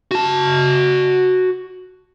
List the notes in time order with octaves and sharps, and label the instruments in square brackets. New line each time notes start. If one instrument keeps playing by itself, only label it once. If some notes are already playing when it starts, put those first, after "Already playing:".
[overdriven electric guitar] F#4 A5